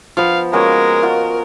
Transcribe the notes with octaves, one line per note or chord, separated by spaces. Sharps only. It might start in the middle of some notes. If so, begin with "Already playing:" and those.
F3 B3 F5
G#3 A#3 C#4 F#4 A#4
F4 F#4 D#5